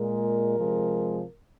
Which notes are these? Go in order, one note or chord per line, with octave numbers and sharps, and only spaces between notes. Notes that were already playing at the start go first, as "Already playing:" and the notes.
Already playing: A#2 G#3 A#4
C3 F3 G#3